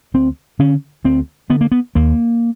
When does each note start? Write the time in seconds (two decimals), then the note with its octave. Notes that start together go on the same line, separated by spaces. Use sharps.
0.14 D2 C4
0.59 D3 C#4
1.04 D2 C4
1.50 D3 B3
1.61 A#3
1.72 B3
1.95 D#2 A#3